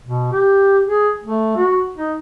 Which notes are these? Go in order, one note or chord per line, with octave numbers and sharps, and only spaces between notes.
B2
G4
G#4
A3
F#4
D#4